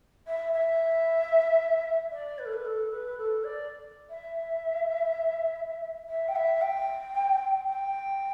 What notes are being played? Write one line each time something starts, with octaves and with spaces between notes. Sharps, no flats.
E5
E5
D5
B4
A4
B4
A4
B4
A4
D5
E5
E5
G5
E5
G5
G5